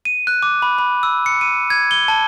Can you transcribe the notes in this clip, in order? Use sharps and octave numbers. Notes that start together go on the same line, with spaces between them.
D#7
F#6
D6
B5
B5
E6
C#7
D#7
G#6
G7
A5